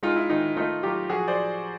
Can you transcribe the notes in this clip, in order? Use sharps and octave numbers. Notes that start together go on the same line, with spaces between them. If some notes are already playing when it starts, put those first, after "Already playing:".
G#3 D#4 F4
E4
D#3 D#4
A3 D#4 F4
F#3 F4 G4
F3 F#4 G#4
C5 D5